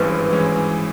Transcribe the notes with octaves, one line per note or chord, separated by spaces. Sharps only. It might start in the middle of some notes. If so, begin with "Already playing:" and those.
Already playing: G#1 G2 E3 G#3 C#4 B4
E3 G#3 C#4